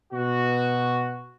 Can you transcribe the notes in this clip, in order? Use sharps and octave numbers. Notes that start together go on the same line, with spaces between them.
B2 F#4